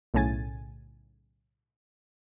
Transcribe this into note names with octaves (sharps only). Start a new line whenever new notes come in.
B1 A2 C#3 G#5 A6